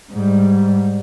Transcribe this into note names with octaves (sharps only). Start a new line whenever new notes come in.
G#2 G3